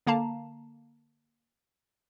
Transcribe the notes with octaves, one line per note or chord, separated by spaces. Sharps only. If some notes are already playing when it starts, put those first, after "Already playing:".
D3 A#3 F5 A5 A#5